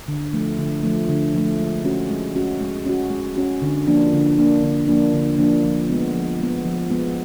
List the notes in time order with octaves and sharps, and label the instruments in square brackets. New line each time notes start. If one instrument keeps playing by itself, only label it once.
[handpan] D3
F3 A3
D3
F3 A3
D3
F3 A3
G#3
C#4 F#4
G#3
C#4 F#4
G#3
C#4 F#4
G#3
C#4 F#4
D3
F3 A#3 D4
D3
F3 A#3 D4
D3
F3 A#3 D4
D3
F3 A#3 D4
F3
G#3 B3
F3
G#3 B3
F3
G#3 B3